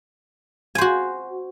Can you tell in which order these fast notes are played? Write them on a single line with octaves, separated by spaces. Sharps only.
G#5 C5 F#4